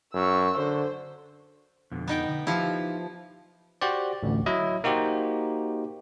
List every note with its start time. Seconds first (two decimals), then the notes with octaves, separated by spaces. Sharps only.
0.14 F#2 C#6 E6
0.57 D3 C5
1.92 F2 B2 D3
2.08 B3 D#4 G5
2.28 D3
2.47 F3 D#4 E4 G4 F5
3.81 F#4 G4 C5 D5
4.23 A1 D2
4.46 F#3 E4 D#5
4.84 A#3 D#4 F#4 G4 C5